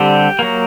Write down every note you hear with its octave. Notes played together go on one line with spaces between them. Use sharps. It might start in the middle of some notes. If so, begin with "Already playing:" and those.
Already playing: D3 G3 C4 G4
F#3 A#3